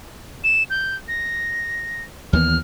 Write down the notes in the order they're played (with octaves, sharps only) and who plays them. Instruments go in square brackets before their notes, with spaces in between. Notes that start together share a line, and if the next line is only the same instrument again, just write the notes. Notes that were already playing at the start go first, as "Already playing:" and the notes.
[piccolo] E7
G6
A#6
[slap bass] D#2 E3 B3 [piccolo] F6